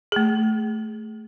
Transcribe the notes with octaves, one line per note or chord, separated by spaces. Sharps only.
A3 G#4